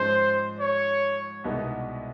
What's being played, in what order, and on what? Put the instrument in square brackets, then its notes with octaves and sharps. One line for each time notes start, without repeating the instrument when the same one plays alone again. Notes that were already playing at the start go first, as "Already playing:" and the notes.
Already playing: [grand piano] G#2 F3 G#3 C#4 [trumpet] C5
[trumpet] C#5
[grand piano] C2 B2 G#3 B3 D#4